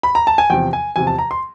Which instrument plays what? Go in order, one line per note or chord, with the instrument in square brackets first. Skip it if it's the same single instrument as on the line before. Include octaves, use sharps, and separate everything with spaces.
[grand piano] B5
A#5
A5
G#5
E2 C3 F3 G5
G#5
E2 C3 F3 G#5
A5
A#5
C6